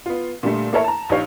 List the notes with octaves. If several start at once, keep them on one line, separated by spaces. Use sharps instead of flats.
B3 F4
A#2 D3 G3 A3
A#3 E4 A4 A#4 C#5 E5
A5 A#5
A#1 D#4 G4 C#5 F5